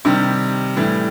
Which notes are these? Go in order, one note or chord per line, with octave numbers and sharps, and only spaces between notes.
C3 D#3 G3
A2 E3 G3